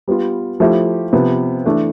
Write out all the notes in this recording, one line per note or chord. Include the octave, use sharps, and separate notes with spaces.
G3 B3 F4
F3 A3 E4 G4
C3 F3 B3
E3 A3 D4